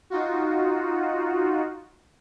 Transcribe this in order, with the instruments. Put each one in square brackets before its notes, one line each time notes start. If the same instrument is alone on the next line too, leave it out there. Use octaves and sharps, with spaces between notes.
[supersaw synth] D#4 F4 F#4